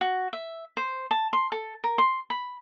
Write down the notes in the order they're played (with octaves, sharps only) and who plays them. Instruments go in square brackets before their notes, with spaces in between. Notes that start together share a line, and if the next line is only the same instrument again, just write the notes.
[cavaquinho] F#4
E5
C5
A5
C6
A4
A#4
C6
B5